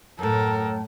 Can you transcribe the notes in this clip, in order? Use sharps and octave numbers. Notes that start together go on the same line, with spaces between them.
F#2 A2 A4 A#4